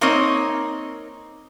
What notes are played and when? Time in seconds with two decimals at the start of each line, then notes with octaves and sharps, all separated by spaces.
0.01 A#3 C4 D#4 A#4 C#5 D#5